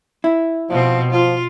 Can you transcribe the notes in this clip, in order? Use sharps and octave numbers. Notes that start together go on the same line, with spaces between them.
E4
B2 F3 C4
F3 F4